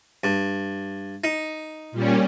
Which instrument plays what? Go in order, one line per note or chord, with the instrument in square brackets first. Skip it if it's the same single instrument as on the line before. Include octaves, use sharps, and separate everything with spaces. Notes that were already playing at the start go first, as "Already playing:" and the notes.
[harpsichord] G2
D#4
[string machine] A#2 G3 C#4